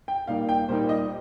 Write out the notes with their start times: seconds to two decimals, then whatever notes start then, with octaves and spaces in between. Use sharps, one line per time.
0.08 G5
0.27 A#2 G3 A#3 D#4 F5
0.49 G5
0.68 A#2 G3 A#3 D#4 C5
0.89 D#5